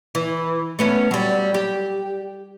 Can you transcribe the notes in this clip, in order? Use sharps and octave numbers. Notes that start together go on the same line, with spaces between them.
E3
A3 B3 C#4
F#3 G3
G4